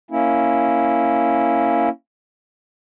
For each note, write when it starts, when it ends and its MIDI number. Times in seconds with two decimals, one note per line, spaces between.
0.11 1.89 58
0.11 1.89 61
0.11 1.89 64